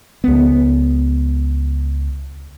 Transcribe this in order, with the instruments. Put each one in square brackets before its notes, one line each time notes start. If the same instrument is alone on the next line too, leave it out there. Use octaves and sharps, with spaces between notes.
[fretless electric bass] C#2 B3